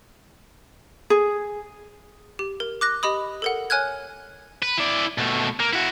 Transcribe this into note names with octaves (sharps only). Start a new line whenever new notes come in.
G#4
G4
A#4
D6 F#6 A#6
G4 D#5 B5 D#6
A4 A#4 F#5
C#5 G#5 F6 F#6 G#6
B4
E4 D5
B2 A3
A#3
E4 F#4